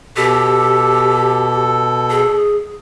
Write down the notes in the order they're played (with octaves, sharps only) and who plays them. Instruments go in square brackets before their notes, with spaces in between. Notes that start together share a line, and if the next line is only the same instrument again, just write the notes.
[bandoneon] B2 A4 [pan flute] G4
[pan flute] G#4